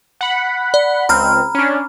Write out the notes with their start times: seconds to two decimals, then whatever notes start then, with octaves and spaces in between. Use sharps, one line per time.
0.21 F#5 B5
0.74 D5
1.09 C#2 C4 A#5 B5 F6
1.55 C#4 D4